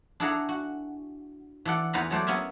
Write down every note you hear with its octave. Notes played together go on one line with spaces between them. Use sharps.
D4 E4 G#4 A4 F#5 A#5
F#4
E3 A4 D5 F#5
E2 B3 B4 C5 A#5 B5
F#3 A3 C5 D5
B3 C#4 G#4 A#4 E5